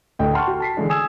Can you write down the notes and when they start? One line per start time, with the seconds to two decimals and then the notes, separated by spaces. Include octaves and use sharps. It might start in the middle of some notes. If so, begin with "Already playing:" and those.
0.19 D1 D3 A3 D#5 G5
0.33 F#5 G5 A5 C6 C#6 F6
0.47 F#4
0.60 A5 B6 C7
0.77 D3 E3 G#3 D4
0.89 G#5 D#6 E6 G#6 E7